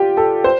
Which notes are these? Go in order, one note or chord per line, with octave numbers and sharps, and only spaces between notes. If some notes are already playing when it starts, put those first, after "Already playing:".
Already playing: F4 G4
A4
C5